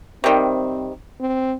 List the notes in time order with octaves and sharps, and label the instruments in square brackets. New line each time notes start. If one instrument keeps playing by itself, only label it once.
[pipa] C3 D#3 G3 [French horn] C4
[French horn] C4